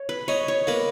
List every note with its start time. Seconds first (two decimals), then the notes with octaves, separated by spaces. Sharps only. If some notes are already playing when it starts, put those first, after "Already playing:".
Already playing: C#5
0.09 B4
0.28 D#4 C#5
0.48 C#5
0.67 A#3 B4